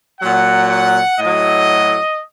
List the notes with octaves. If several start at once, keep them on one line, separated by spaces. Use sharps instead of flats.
A#2 F#3 F#5
F#5
A2 F#3 D#5